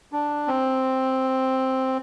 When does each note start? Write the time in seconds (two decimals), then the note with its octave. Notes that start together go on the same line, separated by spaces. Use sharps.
0.12 D4
0.48 C4